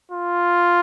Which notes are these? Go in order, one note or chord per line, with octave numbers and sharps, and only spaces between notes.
F4